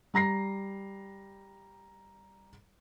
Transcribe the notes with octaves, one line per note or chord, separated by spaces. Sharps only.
G3 A#5 A#6 C7